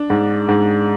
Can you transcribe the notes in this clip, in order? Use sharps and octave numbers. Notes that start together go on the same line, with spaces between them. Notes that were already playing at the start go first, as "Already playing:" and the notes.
Already playing: D4
G#2
G#2